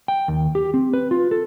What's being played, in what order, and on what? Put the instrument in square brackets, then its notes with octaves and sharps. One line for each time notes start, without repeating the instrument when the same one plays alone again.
[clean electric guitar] G5
D#2
G4
C4
B4
F4
A4